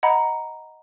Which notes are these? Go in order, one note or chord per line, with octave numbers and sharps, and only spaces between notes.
D#5 F#5 A#5 B5